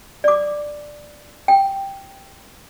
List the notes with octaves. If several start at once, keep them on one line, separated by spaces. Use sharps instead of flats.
D5 D6
G5